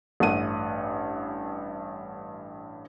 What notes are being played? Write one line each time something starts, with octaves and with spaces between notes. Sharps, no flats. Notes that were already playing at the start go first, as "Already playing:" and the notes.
A1 G2 A3 F#5 D#7